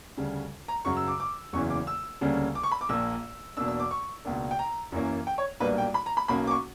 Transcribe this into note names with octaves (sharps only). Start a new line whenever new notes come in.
D2 C#3 G3
A#5
F#2 C#3 F#3 C#6
E6
D6
D6
F#1 E2 C#3 E3 C#6
D6
E6
D2 C#3 G3 A#3 C#4
D6
C#6
B5
D6
A#1 A#2 A#3 E6
E2 B2 A#3 D4 E6
E6
D6
C#6
C#2 B2 A#3 D4
G5
A#5
F#2 E3 A#3 C#4
G5
C#5
B1 A#2 G3 A#3 D4 B4
G5
B5
A#5
B5
B1 B2 A#3 C#4 B5
D6
C#6